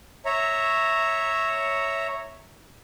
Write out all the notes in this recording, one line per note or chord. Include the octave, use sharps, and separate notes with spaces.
C#5 E5 A#5